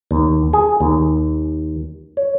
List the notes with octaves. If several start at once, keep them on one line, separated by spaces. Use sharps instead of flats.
D#2
G#4
D#2
C#5